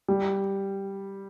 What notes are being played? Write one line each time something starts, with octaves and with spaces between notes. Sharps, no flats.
G3